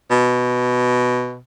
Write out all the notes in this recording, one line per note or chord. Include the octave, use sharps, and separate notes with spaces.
B2